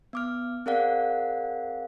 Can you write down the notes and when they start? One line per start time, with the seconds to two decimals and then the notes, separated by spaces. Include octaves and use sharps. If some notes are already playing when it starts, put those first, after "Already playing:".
0.13 B3 D6 F6
0.66 C4 G#4 A#4 D5 F5 F#5